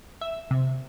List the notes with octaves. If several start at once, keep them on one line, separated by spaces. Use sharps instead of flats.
E5
C3